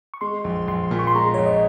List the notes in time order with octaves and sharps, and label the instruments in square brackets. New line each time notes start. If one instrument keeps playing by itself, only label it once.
[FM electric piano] C#6
[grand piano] G#3 [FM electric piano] C6
[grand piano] A#1
[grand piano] A#1 [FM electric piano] C6
[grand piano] A#2
[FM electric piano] C#6
C6
[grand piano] G#3 [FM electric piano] A#5
[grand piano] A#1 [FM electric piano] C#5
[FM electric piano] D#5